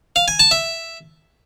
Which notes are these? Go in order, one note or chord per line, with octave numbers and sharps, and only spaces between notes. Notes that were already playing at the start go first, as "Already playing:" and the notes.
F5
G#5
A5
E5